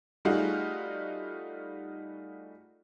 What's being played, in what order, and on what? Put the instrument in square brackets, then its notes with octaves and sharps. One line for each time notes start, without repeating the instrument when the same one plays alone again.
[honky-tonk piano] G3 A3 D#4 F4 F#4 G#4